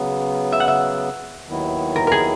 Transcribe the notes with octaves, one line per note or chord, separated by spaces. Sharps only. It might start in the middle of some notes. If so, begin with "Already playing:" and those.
Already playing: C#3 F#3 B3
E5
F#5
E5
D#2 D#3 F#3 B3 E4
A#4
G#4 A#4